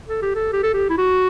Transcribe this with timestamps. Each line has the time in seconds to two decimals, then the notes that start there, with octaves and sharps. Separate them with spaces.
0.08 A4
0.22 G4
0.35 A4
0.53 G4
0.63 A4
0.73 G4
0.89 E4
0.98 F#4